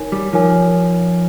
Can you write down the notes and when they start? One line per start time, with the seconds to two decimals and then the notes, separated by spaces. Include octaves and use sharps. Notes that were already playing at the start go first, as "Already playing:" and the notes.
Already playing: D#4 A#4 C#5 G#5
0.12 G3
0.33 F3 D#4 A#4 C#5 G#5